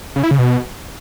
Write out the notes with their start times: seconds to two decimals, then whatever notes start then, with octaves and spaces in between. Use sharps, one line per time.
0.16 C#3
0.24 E4
0.31 C#3
0.39 B2